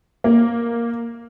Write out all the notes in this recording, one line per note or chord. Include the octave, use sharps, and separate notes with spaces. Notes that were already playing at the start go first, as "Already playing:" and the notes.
A#3